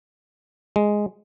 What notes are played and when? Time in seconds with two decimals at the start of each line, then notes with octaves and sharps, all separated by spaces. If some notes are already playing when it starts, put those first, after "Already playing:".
0.76 G#3